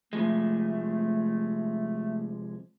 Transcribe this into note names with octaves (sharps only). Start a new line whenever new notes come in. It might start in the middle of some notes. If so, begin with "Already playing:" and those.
C3 F3 G#3 A3